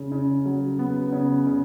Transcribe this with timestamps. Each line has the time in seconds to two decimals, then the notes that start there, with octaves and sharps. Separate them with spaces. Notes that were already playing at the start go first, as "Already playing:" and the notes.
Already playing: C#3
0.12 C#3
0.46 F#3
0.79 B3
1.13 C#3
1.47 C#3